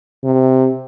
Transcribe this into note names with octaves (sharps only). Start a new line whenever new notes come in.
C3